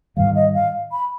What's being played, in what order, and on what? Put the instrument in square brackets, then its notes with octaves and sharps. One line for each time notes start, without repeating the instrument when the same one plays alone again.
[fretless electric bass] G#2 D#3 G3 [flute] F5
[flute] D#5
F5
B5